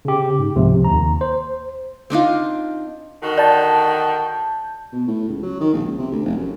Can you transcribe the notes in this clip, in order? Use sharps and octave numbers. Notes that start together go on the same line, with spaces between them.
C#3 G4
G#2
C#2 C3 F3
D#2 A#5
C5
C4 D4 D#4 F4
D3 D#3 F#4
D5 A5 G6
B2
A2
C#2
F#3
D#3
A#1
C#2
C3
D2
F1
F#2